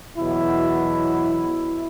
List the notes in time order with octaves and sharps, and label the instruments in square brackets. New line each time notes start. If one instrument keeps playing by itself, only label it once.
[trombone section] E2 B2 F#3 E4